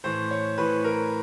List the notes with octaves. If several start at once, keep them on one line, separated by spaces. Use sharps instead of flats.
A2 E3 C5
C#5
A2 E3 B4
A#4